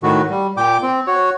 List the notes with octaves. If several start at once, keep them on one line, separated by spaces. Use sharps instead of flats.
A2 D#3 F#4
G3
A#2 G5 D6
C4
F#4 C#5